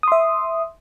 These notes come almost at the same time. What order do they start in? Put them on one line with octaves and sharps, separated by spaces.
D#6 C6 E5